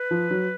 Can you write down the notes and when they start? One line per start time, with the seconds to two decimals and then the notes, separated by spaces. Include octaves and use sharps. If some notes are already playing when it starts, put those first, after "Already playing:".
Already playing: B4
0.11 F3
0.31 F#3